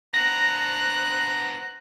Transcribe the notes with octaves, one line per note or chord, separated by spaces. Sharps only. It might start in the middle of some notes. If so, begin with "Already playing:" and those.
B3 D4 C5 A#5 F#6 A#6